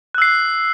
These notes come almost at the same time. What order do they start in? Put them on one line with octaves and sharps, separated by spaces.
F#6 E6 C7